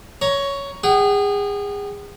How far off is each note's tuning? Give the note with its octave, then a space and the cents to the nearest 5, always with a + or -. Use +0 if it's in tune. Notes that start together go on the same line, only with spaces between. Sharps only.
C#5 +10 A#5 +15
G#4 -30 F#5 +45